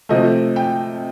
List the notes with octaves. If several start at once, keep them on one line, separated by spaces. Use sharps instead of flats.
C3 F3 A3 D#5
G5